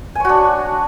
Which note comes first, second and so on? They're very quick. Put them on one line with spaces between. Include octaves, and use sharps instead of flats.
G#5 C#5 F#4 D4